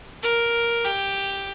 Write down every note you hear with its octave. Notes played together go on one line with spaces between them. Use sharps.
A#4
G4